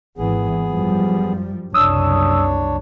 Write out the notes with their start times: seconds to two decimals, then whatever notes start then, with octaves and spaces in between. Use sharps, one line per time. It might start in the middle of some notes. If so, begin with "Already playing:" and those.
0.18 G#1 E3 B3 G#4
0.66 F#2 F3 G3
1.74 F#1 C2 D4 C#5 D#6 E6